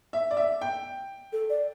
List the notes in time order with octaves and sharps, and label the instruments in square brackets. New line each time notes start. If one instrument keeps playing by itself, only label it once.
[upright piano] E5
D5
E5
G5
[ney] A4
D5